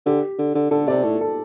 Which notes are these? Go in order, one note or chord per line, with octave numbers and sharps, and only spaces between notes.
D3 G4
D3
D3
D3 A4
C3 D5
A2 A4
A4